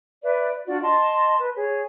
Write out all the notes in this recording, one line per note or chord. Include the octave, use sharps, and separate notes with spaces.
B4 D5 E5
D4 F4 F#4 D5
D#5 A5 C6
B4
G#4 C#5